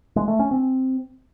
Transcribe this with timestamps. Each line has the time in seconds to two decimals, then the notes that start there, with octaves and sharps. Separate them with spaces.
0.16 G#3
0.28 A3
0.39 C#4
0.51 C4